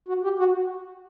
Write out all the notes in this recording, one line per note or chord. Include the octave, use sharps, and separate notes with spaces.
F#4
G4
F#4